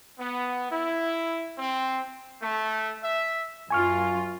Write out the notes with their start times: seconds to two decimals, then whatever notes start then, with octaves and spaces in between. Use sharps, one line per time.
0.19 B3
0.70 E4
1.58 C4
2.43 A3
3.02 E5
3.71 F#2 F4 G#5 C#6 F6